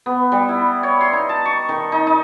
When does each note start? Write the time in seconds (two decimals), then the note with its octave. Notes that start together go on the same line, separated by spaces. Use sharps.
0.06 B3
0.32 G3
0.49 E4
0.83 C#5
1.01 C6
1.13 D#4
1.29 A5
1.45 C#6
1.69 D#3
1.92 D#4
2.07 D#4